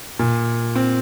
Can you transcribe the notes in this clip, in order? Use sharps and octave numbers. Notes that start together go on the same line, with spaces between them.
A#2
C4